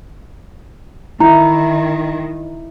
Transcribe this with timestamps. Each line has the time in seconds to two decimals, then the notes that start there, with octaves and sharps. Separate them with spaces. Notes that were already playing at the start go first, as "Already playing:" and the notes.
1.20 D#3 E4 A#5